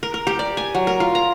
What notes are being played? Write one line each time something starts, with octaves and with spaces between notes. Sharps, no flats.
A#4
A#4
G4
D5
G#5
F#3
A#4
F4
A#5